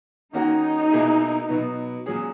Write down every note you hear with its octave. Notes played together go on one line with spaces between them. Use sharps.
D#3 A#3 C#4 D#4 F#4
B2 A#3 E4 G#4 D#5
B2 F#3 B3
A#2 F#3 C#4 G#4